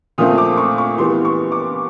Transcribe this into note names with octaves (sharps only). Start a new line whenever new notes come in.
A#2 F3 A3 C4 D#6
D6
C#6
C#6
E3 G3 B3 C6
C#6
D6